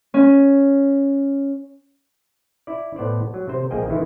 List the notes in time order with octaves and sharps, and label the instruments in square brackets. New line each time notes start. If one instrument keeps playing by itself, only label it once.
[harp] C#4
[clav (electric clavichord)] E4 D5
A2 B3 C5 D5
F#3
C3 C5
A#1 F3 A#3 G#4 D#5 G5
D#3 E3 A3 E4 F4